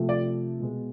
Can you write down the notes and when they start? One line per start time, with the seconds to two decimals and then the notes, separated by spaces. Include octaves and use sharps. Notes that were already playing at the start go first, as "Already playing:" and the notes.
Already playing: C3 F3 A3
0.09 D5
0.60 B2 G#3 B3